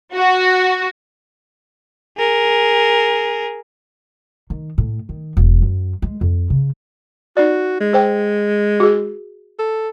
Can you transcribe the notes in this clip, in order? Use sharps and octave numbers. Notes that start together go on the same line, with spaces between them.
F#4
G#4 A#4
D#3
A2
D#3
E1
F#2
G#3
F2
C#3
D#4 F#4 D5
G#3
G#4 C5 G5
F#4 G#4
A4